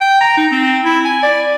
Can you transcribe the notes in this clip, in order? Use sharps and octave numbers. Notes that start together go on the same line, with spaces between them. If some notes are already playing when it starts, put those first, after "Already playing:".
G5
A#5
D#4
C4
E4
G#5
D5